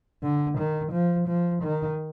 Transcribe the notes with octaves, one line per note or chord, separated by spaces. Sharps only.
D3
D#3
F3
F3
D#3